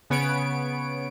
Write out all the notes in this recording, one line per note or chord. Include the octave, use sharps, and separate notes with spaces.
C#3 B3 C#5 D7